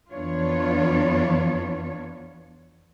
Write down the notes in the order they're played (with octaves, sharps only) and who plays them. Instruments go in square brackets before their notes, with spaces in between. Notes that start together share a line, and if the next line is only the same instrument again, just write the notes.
[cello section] F2 E3 B3 D4 F4 C#5